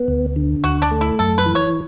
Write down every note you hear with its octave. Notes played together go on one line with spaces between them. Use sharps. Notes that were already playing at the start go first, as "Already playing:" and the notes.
Already playing: B3
D2
D3
D2 F#4
D4
A3
E4
F#2 A4
B4
E3
C#5